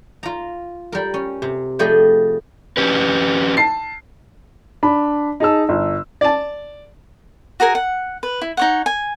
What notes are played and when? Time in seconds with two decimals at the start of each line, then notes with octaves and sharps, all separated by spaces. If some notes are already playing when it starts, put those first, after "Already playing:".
0.23 F4 A#5
0.92 G3 A#4
1.14 C#4
1.42 C3
1.79 F3 G3 A3 G4 G#4 D#5
2.77 C#4 G4 B4
3.57 A5 C7
4.83 D4 B5
5.40 D#4 G#4 A5 E6
5.69 G1
6.21 D5 A5
7.60 F#4 G#4 A#4 G#5
7.75 F#5
8.23 B4
8.41 E4
8.57 D#4 C#5 F#5
8.86 G#5